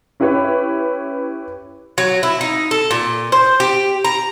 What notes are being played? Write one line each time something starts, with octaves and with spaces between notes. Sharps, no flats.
C#4 E4 G4 B4 C#5
F#3
E4
D#4
A4
A#2
C5
G4
A#5